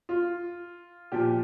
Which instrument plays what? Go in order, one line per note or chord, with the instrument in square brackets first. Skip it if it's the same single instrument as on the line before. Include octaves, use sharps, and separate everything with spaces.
[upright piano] F4
A#2 F3 G4